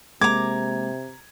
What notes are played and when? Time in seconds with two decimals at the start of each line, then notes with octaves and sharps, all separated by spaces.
0.21 C3 G#3 A#3 A#5 D6 G#6